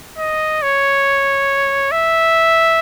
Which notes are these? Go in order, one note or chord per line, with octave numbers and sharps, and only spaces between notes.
D#5
C#5
E5